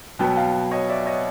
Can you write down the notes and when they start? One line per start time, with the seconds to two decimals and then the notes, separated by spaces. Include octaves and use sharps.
0.19 B2 F#3 B3 G5 A5
0.37 F5 G5
0.71 C#5 D#5
0.89 D5 E5
1.06 C#5 D#5